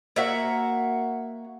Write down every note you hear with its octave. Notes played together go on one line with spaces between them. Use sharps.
A#3 F#4 E5 F#5